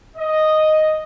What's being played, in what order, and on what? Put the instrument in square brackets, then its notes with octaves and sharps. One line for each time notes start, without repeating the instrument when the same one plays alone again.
[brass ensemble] D#5